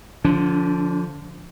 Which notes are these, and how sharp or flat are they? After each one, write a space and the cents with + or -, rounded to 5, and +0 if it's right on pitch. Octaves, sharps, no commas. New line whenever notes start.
D3 +0 F3 +0 D4 -45